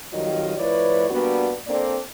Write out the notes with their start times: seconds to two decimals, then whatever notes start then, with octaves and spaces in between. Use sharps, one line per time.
0.13 F2 D#3 F#3 G3 F4 D#5
0.57 A2 F3 E4 B4 C#5 D5
1.10 G3 A#3 B3 D4 F#4
1.67 A#3 C4 D4 A4 D5